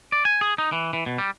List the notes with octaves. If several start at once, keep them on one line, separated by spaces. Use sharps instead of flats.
D5
G#5
G#4
D#4
E3
E3
B2
G3